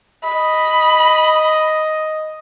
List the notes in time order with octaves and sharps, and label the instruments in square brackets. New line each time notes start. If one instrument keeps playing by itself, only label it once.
[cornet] D#5 [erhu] B5